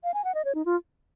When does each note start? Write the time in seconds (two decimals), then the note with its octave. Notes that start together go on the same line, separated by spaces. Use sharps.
0.04 F5
0.14 G#5
0.24 F#5
0.35 D#5
0.45 C#5
0.55 D#4
0.66 F4